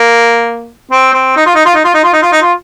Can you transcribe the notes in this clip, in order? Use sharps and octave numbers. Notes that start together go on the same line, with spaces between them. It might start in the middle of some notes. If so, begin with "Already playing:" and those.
Already playing: A#3
C4
C4
D#4
F4
D#4
F4
D#4
F4
D#4
F4
D#4
F4
D#4
F4